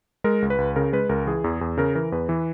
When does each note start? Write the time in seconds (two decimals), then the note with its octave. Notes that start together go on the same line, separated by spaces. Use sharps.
0.24 G#3 A#4
0.42 C#2
0.50 B4
0.58 C#2
0.76 C#3 A#4
0.93 G#3 B4
1.09 C#2 A#4
1.26 E3 G#4
1.44 E2
1.61 E2
1.77 C#3 A#4
1.95 E3 A#4
2.12 E2 B4
2.29 E3